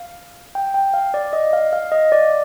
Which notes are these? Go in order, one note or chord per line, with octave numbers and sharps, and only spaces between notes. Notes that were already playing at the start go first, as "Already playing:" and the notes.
Already playing: F5
G5
G5
F5
D5
D#5
F5
F5
D#5
D5